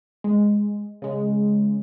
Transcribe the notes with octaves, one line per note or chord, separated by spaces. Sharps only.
G#3
C#3 G#3